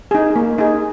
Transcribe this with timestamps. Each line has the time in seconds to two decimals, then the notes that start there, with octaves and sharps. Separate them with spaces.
0.11 D#4 G#4
0.36 A#3
0.58 D#4 G#4